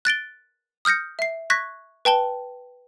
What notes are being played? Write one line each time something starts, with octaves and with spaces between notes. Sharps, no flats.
F#6 A6 D7 G7
D#6 F6 G6 A#6 C#7
E5 C7
C#6 F#6 G#6 A#6 B6
B4 G5 A5 G7